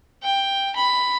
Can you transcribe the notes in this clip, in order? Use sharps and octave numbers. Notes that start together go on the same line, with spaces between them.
G5
B5